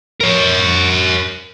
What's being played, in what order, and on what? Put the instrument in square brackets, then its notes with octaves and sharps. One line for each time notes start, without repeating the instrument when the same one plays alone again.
[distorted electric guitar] A#4 C#5